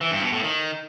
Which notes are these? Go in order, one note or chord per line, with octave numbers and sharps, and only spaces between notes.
E3
G2
B2
A2
D#3